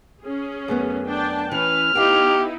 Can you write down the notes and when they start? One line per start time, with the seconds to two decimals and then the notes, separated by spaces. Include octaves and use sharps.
0.22 C#4 G#4
0.68 F#2 A3 B3
1.07 D4 G5 A5
1.52 E3 C#4 B4 F6
1.95 B3 D#4 E4 G4 D#5 F5 G5